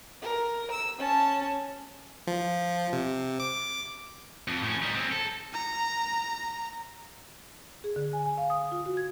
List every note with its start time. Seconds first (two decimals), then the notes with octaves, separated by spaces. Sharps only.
0.22 A#4
0.70 E6
0.99 C#4 A5
2.27 F3
2.93 C3
3.40 D6
4.48 F2
4.63 A2 C#4
4.82 G3 D#4
4.95 C4 C#4
5.12 A4
5.53 A#5
7.84 G#4
7.96 D3
8.13 G#5
8.26 G#5
8.38 F5
8.50 D#6
8.72 F4
8.86 F#4
8.97 G#6